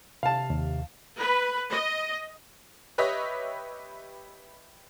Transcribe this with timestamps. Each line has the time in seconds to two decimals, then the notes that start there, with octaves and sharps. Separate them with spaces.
0.23 C3 F5 A5
0.50 D#2
1.19 B4
1.70 D#5
2.98 G4 B4 C#5 D#5 E5